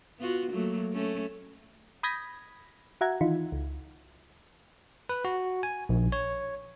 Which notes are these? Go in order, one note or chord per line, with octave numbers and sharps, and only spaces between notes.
B3 F4 F#4
F#3 A3 A#3
A3 C#4
B5 D#6 G6 G#6 A#6 B6
F#4 E5 F#5 A#5 G#6
D#3 E3 D#4 F4
C#2
B4
F#4
G#5
A#1
C#5